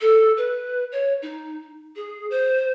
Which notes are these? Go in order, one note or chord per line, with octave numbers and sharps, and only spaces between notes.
A4
B4
C#5
D#4
G#4
C5